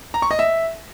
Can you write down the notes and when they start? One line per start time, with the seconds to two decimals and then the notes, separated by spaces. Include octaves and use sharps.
0.14 A#5
0.22 C#6
0.31 D#5
0.39 E5